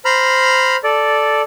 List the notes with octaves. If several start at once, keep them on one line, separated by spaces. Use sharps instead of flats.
C5 A#5 B5 F6
A4 D5